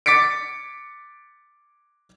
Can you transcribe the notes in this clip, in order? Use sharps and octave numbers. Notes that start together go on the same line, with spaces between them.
D6 A6 B6 C#7 D7